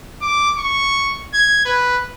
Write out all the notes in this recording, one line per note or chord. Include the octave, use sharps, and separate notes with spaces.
D6
C#6
G#6
B4